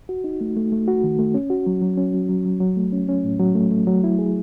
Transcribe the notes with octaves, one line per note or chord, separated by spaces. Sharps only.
F#4
D#4
A3
A3
A3
F#4
D#3
A3
C#4
F#4
F#3
F#3
C#4
F#3
F#3
F#3
F#3
A3
C#4
C#4
A2
F#3
A3
A3
F#3
E4
G#4